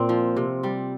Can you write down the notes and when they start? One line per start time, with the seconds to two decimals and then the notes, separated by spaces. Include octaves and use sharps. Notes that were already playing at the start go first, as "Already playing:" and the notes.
Already playing: A#2 C4
0.09 F3
0.37 C3
0.63 G3